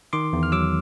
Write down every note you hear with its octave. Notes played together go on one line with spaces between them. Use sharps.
D#3 C6 D6
E2
F6
F#3 D6 E6